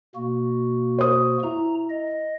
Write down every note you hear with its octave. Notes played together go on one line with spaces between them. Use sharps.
B2 A#3 F#4
C5 D#6
E4 A#5
D#5